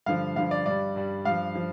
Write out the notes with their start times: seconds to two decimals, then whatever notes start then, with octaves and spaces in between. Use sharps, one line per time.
0.06 G2 D3 F3 F5
0.36 G2 D3 F3 F5
0.51 D5
0.66 G2 G3 D5
0.96 G2 G3
1.25 G2 F3 F5
1.55 F3